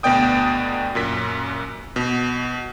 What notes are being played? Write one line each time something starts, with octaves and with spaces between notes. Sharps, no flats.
D2 B2 B3 D5 G5 D#6
F#2 A#2 B6
B2